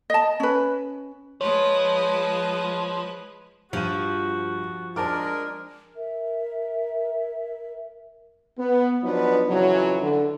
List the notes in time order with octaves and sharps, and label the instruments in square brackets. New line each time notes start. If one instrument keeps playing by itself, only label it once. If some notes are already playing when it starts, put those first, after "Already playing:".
[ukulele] D#5 A5
C#4 B4
[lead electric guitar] F3 [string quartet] G#3 B4 [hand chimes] C#5
[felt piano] G2 D#7 [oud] F3 [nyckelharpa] F#4
[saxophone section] G#3 A#4 [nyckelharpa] D4 [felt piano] C5 A5 D6
[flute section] A#4 E5
[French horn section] B3
F3 F#3 B3 D4 D#4 B4
F2 C#3 E3 F#3
D3